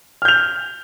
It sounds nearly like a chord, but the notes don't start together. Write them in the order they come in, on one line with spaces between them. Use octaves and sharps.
F6 G6 F7